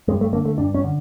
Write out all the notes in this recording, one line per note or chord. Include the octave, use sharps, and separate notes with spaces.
G2 G#3
A3
D3 A#3
A3
G2 D4
C#4
D3